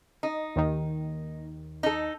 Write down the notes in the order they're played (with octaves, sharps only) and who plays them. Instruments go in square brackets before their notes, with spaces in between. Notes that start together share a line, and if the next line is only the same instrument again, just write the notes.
[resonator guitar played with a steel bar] D#4
[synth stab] D#2 D#3
[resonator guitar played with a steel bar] D#4 A4